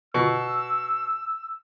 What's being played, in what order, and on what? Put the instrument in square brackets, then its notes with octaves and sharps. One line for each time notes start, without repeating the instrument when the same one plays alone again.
[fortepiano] B2 [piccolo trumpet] E6